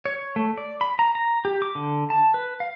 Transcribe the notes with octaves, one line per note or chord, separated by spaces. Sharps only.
C#5
A3
D5
B5
A#5
A#5
G4
D6
D3
A5
B4
F5